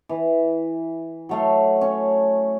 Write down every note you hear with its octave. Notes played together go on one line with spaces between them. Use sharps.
E3
F#3 A3 F5
C#4